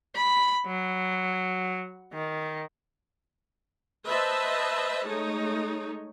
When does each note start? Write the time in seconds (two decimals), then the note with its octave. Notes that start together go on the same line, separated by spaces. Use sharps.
0.15 B5
0.67 F#3
2.13 D#3
4.06 B4 C5 D#5 E5 A5
5.06 G#3 A3 D#4 C#5